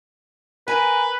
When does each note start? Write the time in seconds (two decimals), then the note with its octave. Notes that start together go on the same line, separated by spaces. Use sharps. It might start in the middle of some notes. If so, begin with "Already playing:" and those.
0.68 A#4 B4 G#5